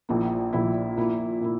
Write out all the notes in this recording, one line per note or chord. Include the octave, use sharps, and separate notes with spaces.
A#1 A#2 A#3 E4
A#1 A#2 A#3 E4
A#2 A#3 E4
A#2 A#3 E4